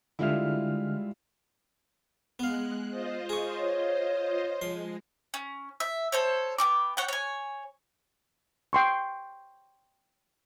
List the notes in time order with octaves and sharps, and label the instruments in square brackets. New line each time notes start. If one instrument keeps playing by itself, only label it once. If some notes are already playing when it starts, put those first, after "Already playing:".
[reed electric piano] D3 F6 [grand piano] G3 F4 E5 [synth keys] G#3 E4
[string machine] G#3 F#6 [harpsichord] B3 F5
[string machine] F4 C5 D#5
[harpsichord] G#4 C#6
[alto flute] C#5
[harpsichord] F3 C6 [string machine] G#3
[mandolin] C#4
E5
A4 C5 C#5
B3 G5 D6
C#5 F#5 G5
C#5 G#5
[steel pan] G5 C6 C#6